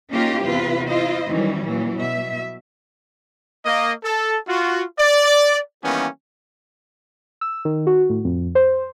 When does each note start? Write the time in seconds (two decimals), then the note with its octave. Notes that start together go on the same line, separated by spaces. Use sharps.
0.11 A#3 C#4 D#4 F4 G4 A#4
0.44 E2 C3 C4 F4 B4
0.88 E4 F4 C5 D#5
1.28 D#3 E3 F#3 G3 C#4
1.66 A#2 E3 F#3
2.00 B2 E5
3.66 A#3 D#5
4.04 A4
4.48 F4 F#4
4.99 D5
5.84 D#3 E3 G3 A#3 B3 C#4
7.41 E6
7.65 D#3
7.87 F#4
8.09 A2
8.25 F2
8.55 C5